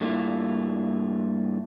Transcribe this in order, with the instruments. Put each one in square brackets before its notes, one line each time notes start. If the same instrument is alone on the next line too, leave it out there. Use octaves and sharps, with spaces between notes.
[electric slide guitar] G2 A3 A#3 E4 F4